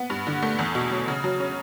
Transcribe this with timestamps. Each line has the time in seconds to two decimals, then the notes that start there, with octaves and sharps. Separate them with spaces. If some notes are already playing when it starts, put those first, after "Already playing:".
Already playing: B3
0.10 G2
0.27 D3
0.42 A3
0.59 E2
0.75 B2
0.91 F#3
1.08 C#3
1.24 F#3
1.40 C#4